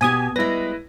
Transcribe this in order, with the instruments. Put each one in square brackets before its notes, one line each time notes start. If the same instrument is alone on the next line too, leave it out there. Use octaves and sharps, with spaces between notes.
[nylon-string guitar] B2 G4 [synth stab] G#5 D#6 G#6
[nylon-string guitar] G3 G#3 [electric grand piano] E4 B4 [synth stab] A#6